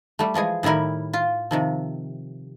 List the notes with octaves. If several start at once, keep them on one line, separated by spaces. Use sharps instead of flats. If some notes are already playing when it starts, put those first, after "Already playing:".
G3 A3
E3 F3 G#3 G#4
A2 D#3 G3 E4 A#4
F4
C3 D#3 F3